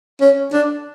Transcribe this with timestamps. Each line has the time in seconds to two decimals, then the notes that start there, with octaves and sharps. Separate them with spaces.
0.21 C#4
0.53 D4